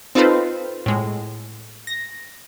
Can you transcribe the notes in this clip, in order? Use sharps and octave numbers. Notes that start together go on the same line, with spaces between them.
C4 D#4 F4 A4 B4 C5
A2 G#3
A#6